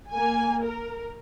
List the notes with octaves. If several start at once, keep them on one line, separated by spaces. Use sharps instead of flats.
A#3 G#5
A#4